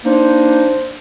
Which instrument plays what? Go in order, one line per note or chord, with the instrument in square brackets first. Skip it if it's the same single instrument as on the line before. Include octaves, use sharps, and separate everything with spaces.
[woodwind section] A#3 D4 D#4 C5